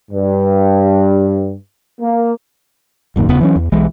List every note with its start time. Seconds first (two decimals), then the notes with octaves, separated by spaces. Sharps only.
0.11 G2
2.01 A#3
3.16 D1 F#2 A#2 D#3
3.29 F1 E2 C#3 B3
3.41 E3 F#3 C#4
3.56 E2
3.72 B1 E3 G#3